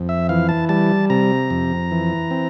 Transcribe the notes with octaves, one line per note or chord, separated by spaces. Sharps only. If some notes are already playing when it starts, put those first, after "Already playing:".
Already playing: F2
E5
E3 F5
A5
G3 A5
C3 A#5
F2
E3
C4